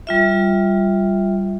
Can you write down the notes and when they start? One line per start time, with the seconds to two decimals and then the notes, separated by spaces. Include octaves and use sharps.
0.07 G3 F4 E5